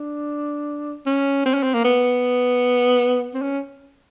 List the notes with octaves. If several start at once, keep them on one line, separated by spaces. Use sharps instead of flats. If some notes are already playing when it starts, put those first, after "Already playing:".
Already playing: D4
C#4
C4
C#4
C4
A#3
B3
C4
C#4